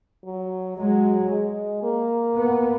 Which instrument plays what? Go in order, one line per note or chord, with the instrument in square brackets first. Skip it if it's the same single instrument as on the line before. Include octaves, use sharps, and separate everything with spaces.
[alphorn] F#3
[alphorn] F#3 [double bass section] G#3
[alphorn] G#3
A#3
[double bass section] B3